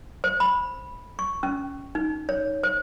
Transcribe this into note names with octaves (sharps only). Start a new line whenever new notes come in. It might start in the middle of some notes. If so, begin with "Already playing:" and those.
C5
B5
C#6
C#4
D#4
C#5
C5